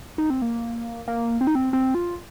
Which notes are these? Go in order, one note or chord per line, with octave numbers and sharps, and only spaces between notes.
D#4
C4
A#3
A#3
C4
D#4
C4
C4
F4